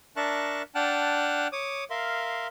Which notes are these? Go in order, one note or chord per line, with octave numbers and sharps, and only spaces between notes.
D4 A#4 E5 A5 C#6 F#6
D4 F#5 G5 A5 F6 F#6
C#5 D6 D#6
A#4 E5 F5 C6